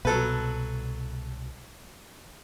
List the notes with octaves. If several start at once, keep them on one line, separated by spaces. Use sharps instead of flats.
C2 B2 F#3 B3 A4 B4